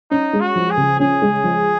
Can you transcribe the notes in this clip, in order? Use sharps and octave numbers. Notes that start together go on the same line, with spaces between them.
C#4 D#4
G#3
F#4
F3
G#4
C#3
C#4 G#4
G#3
F3